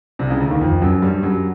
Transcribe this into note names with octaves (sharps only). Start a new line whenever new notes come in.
C2 C3
C#2 C#3
D2 D3
D#2 D#3
F2 F3
F#2 F#3
G2 G3
F#2 F#3